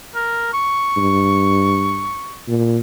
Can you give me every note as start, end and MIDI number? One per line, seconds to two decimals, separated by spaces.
0.15 0.51 70
0.53 2.39 85
0.97 2.14 43
2.48 2.79 46